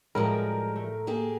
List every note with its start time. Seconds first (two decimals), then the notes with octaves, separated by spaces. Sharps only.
0.15 A2 F3 G3 G#3 A#4
0.76 A3
1.07 A#3 G4 G#4